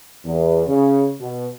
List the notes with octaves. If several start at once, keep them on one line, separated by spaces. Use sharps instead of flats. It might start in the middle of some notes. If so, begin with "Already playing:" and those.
E2
C#3
B2